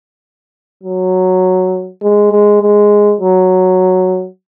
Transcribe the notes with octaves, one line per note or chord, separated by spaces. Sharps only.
F#3
G#3
G#3
G#3
F#3